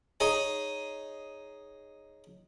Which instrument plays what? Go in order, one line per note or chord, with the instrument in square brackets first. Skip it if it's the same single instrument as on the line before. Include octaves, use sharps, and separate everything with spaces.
[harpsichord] D#4 G#4 C#5 G#5